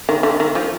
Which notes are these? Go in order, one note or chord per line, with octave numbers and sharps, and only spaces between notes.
D#3
D3
D#3
F3